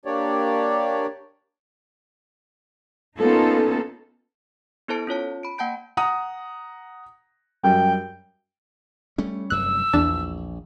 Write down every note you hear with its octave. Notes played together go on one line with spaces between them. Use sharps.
A#3 D4 G4 C#5 D5
A#3 B3 C#4 D#4 F4 A4
B3 E4 A4 C5 A5 D7
C#4 F4 C#5 A5
B5 D7
A#3 F#5 G5 A5 G6 D7
F#5 A#5 D#6
F#2 G3 G5
G3 A3 C#4
F1 F#2 G3 E6 F#6
A#1 E2 D4 A5